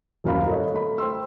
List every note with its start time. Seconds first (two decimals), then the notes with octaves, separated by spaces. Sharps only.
0.24 D#1 F#2 F#3 F5 A#5 B5
0.46 F#4 A4 A#4 C#5 D#5
0.74 A3 B5
0.98 C5 G5 C6 E6